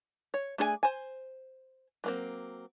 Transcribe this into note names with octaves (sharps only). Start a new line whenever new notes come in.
C#5
A3 D4 G#4 A4 G#5
C5 G#5
F#3 A#3 C4